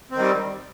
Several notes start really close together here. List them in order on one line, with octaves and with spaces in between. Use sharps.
C4 D#3 G3